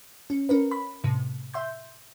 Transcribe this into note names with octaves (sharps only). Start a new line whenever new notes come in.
C#4
C#4 A#4 B4
B5
A2 C3
E5 C6 G6